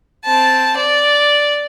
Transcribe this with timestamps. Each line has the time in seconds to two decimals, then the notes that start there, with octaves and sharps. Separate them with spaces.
0.25 C4 A5
0.77 D5